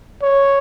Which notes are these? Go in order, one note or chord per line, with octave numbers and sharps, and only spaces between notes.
C#5